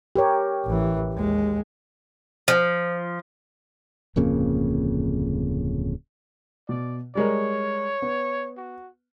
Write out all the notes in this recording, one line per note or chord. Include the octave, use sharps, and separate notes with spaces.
G4 A#4 C#5
A1 E3
D#2 G#3
F3
D1 F2 C#3 A#3
B2 D5
G3 G#3 A#4 C#5
B3
F#4